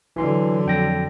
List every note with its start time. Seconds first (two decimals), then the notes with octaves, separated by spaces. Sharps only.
0.16 D3 E3 F#3 C6
0.66 F2 G5 A#6